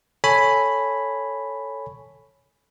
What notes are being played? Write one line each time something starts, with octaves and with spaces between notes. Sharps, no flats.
A4 C#5 G#5 B5